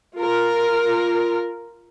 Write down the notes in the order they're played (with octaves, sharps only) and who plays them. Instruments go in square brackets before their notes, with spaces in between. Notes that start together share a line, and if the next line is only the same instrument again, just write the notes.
[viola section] F4 A#4